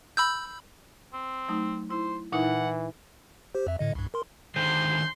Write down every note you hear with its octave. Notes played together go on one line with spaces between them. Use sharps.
B5 E6 G6
C4
F#3 A3 D#4
E4 C5
A#2 E3 D#4 E4 F#5
G4 C5
F2 E5
A2 D3 D#5
C2 G2
A#4 C6
D3 D#3 C5 C6 G6